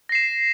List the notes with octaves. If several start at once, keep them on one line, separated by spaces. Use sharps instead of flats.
A#6 C7 E7